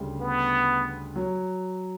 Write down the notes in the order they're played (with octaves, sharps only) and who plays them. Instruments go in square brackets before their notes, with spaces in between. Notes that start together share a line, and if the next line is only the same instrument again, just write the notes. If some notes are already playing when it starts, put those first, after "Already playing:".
Already playing: [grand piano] D2 C#3 G3
[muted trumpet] B3
[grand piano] F#3